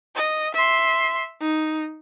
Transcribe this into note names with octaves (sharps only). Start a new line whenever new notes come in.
D#5
E5 C6
D#4